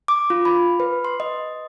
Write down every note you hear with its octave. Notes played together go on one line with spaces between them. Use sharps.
D6
F4
B5
B4
C6
D#5